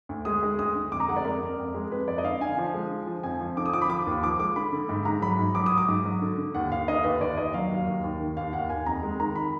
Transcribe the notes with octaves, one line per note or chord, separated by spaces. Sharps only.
D2
G#3 D#6
G#3
D2 D#6
D3
F2 D6
A#5
G#3 F#5
D5
F2 A#4
F2
F2
G#3
F2 B4
F2 D5
D#5
D3 F5
D3 G#5
F3
G#3
D3
F3
F2 G#5
F3
D3 D6
D#6
F3 D6
B5
F3 D6
D#2
F3 D6
G#3 D6
D3 B5
D3
G#2
G#2 A#5
F#3 B5
G#2
F#3 D6
D#6
F#3
D6
G#2
F#3
D3
D3
D#2 F#5
D#2 F5
D3 D#5
D#2 B4
D#2 D5
D#2 D#5
F#3 F5
D#2
D#2
D#2
D#3
D#2 F5
D#2 F#5
D#2 G#5
F2 A#5
G#3
D#3 A#5
B5